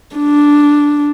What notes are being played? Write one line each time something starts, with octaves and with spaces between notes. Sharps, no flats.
D4